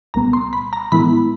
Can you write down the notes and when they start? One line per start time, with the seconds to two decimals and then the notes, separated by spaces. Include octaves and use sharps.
0.14 C2 A#2 G3 B3 A#5
0.33 C6
0.53 B5
0.73 A#5
0.92 A2 E3 G#3 B3 E4 B5